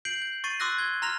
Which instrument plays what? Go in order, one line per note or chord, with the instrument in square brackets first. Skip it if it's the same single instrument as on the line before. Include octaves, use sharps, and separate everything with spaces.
[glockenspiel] G6 C7 D7 F#7
G6
C#6 A6 C7 D#7
C6 D6 E6 F#6 A#6
G#6 G7
A#5 C6 F6 A#6 F7